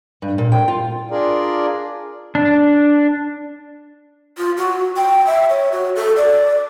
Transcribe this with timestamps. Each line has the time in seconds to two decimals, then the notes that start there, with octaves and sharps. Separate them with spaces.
0.22 G2
0.38 A#2
0.52 G5
0.68 F4
1.11 D4 F4 G#4 A#4 D5
2.35 D4
4.38 F4
4.57 F#4
4.97 G5
5.27 E5
5.50 C#5
5.72 F#4
5.96 A4
6.17 D5